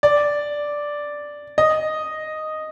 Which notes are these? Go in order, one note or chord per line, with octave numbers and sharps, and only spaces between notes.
D5
D#5